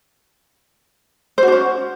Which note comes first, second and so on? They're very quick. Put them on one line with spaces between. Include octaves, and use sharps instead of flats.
C5 F#4 D4 C#4